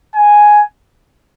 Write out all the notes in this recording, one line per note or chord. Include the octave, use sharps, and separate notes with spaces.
G#5